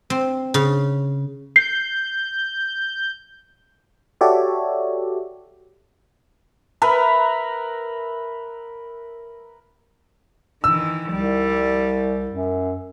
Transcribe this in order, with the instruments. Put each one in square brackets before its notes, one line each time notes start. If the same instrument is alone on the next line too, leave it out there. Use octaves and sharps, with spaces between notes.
[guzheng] C4
C#3
[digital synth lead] G6 [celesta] C7
[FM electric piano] F#4 G4 A4 C#5 D5 E5
[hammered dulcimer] A#4 B4 E5 A#5
[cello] D#3 E3 [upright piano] E6
[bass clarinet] C2 [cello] G3
[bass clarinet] F#2